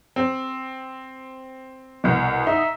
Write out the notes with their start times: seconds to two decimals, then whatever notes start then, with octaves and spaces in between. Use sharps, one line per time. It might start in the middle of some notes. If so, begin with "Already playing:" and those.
0.16 C4
2.04 C2 B2
2.47 D#4 E5